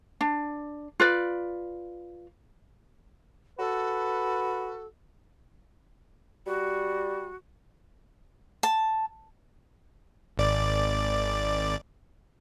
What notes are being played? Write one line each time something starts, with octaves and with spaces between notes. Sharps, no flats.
D4
F4 B4 D5
F#4 A4 B4
G3 F#4
A5
G#1 D5